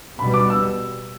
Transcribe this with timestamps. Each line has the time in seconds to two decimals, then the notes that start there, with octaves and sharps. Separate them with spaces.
0.19 B2 G3 B3 B5
0.34 D6
0.50 E6